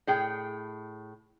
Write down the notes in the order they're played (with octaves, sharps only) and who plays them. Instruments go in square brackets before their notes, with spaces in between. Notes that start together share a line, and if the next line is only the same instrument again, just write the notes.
[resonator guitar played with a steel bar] A2 G#4 G5